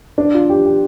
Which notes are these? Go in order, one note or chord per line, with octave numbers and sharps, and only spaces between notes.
D4
F4
G4
G4